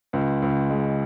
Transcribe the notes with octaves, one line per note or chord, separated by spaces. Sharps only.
C#2
C#2
G#3